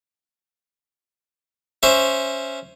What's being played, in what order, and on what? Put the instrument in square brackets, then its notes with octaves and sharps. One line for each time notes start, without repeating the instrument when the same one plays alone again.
[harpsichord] C#4 C5 E5